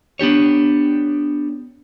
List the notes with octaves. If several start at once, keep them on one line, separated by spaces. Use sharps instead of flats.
B3 D4 G4 C#5